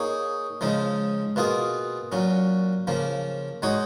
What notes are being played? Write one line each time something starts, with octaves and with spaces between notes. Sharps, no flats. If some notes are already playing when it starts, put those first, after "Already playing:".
Already playing: A#3 D#4 G#4 C#5
C#3 F3 G#3 D#4
B2 A#3 F4 G#4
A#2 F#3 C#4
C#3 F3 A#3
G#3 D#4 F#4 C#5